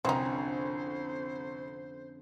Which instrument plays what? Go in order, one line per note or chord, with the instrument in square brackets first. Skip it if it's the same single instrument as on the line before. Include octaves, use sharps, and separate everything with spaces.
[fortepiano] C2 [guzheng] F2 D3 C#4 [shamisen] C4 D#4 [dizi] C5